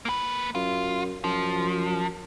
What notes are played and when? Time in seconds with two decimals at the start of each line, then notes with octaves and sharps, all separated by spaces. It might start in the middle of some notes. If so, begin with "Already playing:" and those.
0.05 A#3 B4
0.55 F#2 F4
1.24 F#2 F3